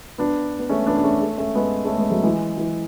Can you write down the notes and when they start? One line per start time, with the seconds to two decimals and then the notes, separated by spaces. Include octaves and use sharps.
0.18 B3 D4
0.59 B3
0.69 A3 C#4
0.87 B3 D4
0.97 D4
1.04 A3 C#4
1.21 A3 C#4
1.38 A3 C#4
1.55 G#3 B3
1.85 A3 C#4
1.98 G#3 B3
2.10 F#3 A3
2.23 E3 G#3
2.57 E3